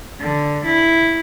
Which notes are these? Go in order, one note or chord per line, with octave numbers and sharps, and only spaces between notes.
D3
E4